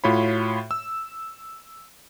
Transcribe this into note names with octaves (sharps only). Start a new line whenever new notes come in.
A2 F4 F#4 C#5 B5
E6